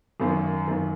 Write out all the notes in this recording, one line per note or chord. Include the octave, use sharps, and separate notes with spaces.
G#1 F#2 D#3
G#1 F#2 D#3